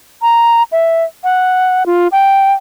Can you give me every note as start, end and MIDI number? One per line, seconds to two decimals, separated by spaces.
0.22 0.63 82
0.72 1.04 76
1.24 1.86 78
1.86 2.08 65
2.12 2.53 79